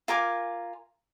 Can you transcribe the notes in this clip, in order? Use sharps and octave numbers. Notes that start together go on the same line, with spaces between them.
F4 A#4 G#5 D6